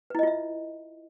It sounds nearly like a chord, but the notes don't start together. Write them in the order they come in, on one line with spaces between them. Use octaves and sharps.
B4 E4 D#5 F4 E5